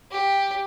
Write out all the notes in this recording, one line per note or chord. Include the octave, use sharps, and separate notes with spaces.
G4